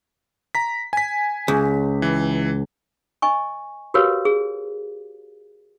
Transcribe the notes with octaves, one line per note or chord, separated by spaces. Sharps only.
A#5 B6
G#5 B6
C#2
E3
D#5 G#5 C#6
F#4 G4 A#4 B4 C#5 F5
G#4